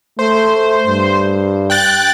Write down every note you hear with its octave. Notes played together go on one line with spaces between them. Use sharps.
A3 C5
G2
G5 F#6 A6